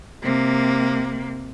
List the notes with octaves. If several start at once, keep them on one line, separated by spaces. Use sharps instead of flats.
C3 A#3